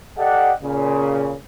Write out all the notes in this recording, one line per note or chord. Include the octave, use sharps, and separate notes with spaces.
G4 A4 D5 D#5 F#5
A#2 C#3